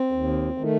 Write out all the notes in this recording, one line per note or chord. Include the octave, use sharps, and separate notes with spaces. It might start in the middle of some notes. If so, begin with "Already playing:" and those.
Already playing: C4
D#2
D#3 A3